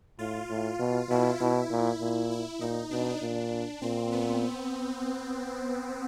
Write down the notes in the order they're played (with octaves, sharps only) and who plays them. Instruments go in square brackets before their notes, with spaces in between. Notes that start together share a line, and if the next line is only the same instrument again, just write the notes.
[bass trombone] A2 [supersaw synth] F4
[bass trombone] A2
B2
[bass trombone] B2 [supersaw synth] E4
[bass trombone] B2 [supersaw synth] E4
[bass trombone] A#2
[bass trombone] A#2 [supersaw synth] E4
[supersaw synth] E4
[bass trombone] A#2 [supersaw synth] D#4
[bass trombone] B2 [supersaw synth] D4
[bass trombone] A#2
[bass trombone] A#2 [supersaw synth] C4
[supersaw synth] B3